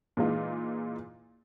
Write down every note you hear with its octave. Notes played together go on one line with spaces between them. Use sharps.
A#2 E3 G#3 D#4 F4